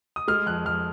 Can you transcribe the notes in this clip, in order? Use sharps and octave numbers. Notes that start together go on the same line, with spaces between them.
D#6
G#3 F6
F2 F#6
F2 F6